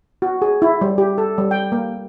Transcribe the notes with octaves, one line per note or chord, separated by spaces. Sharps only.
F#4
G#4
E4
G3
G4
A4
G3
G5
A#3